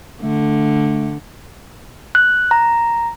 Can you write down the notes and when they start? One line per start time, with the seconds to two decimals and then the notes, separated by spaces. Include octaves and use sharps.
0.22 D3 A3
2.15 F#6
2.51 A#5